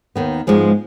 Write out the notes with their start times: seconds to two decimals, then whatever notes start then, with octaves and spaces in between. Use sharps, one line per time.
0.16 D#2 D#3 B3
0.47 G#2 F3 G#3 B3